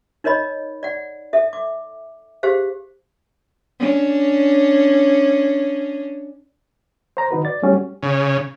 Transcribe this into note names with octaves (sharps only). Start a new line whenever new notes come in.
D#4 A#4 C#5 D#5 B5
D5 F#5
A4 E5
D6
G4 G#4 C5 F5
C#4 D4
C5 A#5
D#3 D#4 F#4 B4
D5 A6
G3 A3 C#4 F#4 G4
C#3